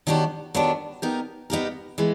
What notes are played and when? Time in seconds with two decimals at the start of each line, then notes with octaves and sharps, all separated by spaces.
0.07 D#3 F#3 B3 D4 G4
0.55 D#3 F#3 B3 D4 G4
1.02 B3 D#4 G4 A#4
1.50 B3 D#4 G4 A#4
1.98 E3 G#3 B3